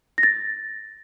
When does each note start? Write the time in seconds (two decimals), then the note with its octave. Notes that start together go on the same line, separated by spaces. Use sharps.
0.18 A#6
0.23 A6